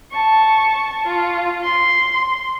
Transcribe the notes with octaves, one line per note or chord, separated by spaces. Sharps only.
A5 C#6
F4
C6